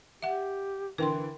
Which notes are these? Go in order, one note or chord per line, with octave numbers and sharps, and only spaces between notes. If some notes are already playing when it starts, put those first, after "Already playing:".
G4 E5 F#5
D3 E3 A#4 G5 C6